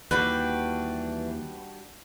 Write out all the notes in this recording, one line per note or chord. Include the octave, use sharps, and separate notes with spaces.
D#2 E3 G3 D4 F#4 B4